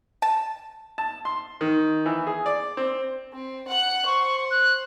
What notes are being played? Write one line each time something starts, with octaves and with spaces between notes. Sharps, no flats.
A5
A5
C6
D#3
E3
G#4
D5
C4
C4
F#5 F#6
C5 C#6
F#6